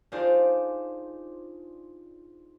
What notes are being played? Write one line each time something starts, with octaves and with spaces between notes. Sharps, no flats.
D4 D#4 F4 G#4 C5 D5